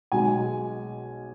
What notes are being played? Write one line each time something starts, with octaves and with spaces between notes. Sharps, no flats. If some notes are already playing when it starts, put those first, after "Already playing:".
B1 B2 G#3 G#5